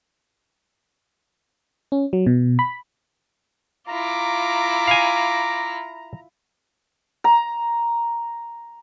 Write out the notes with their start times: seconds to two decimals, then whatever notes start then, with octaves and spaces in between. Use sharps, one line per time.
1.92 C#4
2.13 F#3
2.26 B2
2.59 B5
3.87 E4 F4 A#5 D6
4.87 F5 G#5
7.24 A#5